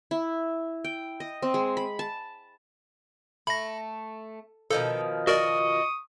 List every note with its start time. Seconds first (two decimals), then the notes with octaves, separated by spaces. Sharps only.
0.11 E4
0.84 G5
1.20 D#5
1.42 C4
1.54 G#3
1.77 B5
1.99 A5
3.47 A3 B5 A#6
4.71 B2 D#3 F3 A4
5.27 F#4 A#4 D5 D#5 C#6 D#6